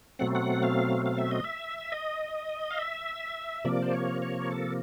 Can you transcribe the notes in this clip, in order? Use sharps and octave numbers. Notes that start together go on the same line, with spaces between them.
B2 F#3 A3 C4 F#5
F#5
F5
F5
E5
D#5
E5
D#5
F5
E5
C3 F3 A#3 D5
C5
C#5
C#5
A4